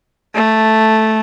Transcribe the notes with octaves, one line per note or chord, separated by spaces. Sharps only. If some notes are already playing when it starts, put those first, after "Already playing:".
A3